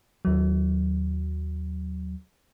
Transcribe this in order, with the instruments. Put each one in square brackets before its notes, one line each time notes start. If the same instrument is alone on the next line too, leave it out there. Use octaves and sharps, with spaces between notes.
[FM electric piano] D#2 F#3